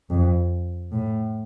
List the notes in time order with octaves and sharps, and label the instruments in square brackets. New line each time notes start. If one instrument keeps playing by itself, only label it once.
[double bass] F2
A2